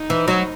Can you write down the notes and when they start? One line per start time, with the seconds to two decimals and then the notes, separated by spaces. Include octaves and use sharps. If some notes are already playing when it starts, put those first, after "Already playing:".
Already playing: D#4
0.10 E3
0.28 F#3